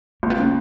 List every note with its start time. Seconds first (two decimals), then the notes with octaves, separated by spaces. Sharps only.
0.23 C#2 A#3
0.30 B3
0.38 C#3 A#3